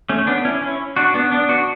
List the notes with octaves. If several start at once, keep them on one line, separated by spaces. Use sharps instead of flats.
A3 C#4
B3 D4
C#4 E4
C#4 E4
D4 F#4
B3 D4
B3 D4
D4 F#4